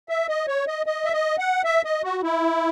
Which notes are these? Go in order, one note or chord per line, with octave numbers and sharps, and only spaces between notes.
E5
D#5
C#5
D#5
D#5
E5
D#5
F#5
E5
D#5
F#4
E4